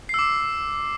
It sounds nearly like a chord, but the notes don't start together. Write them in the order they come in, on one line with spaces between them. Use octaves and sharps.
C7 E6 D6